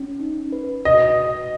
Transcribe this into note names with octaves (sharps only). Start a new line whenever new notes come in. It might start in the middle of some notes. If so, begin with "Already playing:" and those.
Already playing: C#4
D#4
B4
F#4 D#5